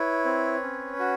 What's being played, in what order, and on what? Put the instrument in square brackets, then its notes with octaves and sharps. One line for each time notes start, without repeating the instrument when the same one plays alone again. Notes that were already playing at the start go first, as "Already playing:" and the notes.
Already playing: [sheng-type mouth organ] E4 B4 C#5
C4
C#4
F#4